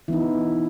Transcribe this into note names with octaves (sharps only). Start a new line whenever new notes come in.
E3 B3 D#4 E4